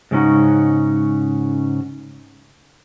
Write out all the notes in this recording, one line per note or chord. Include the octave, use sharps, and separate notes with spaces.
G#2 C#3 G#3 C#4 D#4 F#4